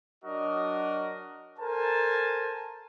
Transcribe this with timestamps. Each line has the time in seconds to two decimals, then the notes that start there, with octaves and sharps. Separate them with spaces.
0.24 F#3 D4 F#4 A#4 D#5
1.59 A4 A#4 C5 G#5 A5